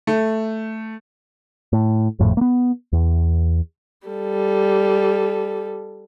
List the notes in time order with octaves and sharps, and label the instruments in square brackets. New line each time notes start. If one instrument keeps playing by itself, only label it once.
[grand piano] A3
[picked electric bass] A2
G#1 F2 A2
A#3 B3
E2
[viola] G3 A4